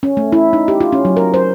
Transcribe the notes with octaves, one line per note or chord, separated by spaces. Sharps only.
C#4
A3
E4
D#4
G4
F4
C#4
F#3
A#4
C5